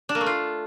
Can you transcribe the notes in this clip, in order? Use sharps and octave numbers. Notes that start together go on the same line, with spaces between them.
D4
A#3
A3
F4